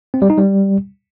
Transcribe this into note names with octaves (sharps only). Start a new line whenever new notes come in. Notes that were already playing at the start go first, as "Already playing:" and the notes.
C4
G3
D#4
G3